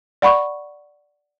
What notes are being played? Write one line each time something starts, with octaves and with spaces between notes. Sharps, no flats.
D5 F#5 B5 C#6